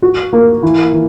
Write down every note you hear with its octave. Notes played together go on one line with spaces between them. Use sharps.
F#4
A#3
E3
E3